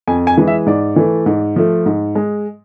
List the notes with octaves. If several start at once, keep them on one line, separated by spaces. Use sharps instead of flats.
F2 G#5
G#5
E3 G#3
E5
G#2 D5
E3 A3
G#2
F3 A3
G#2
G#3